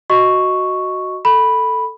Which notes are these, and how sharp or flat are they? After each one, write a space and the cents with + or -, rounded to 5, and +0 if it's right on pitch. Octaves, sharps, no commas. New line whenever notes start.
F#4 +0 D#5 +0 C#6 +0
A4 +5 B5 -5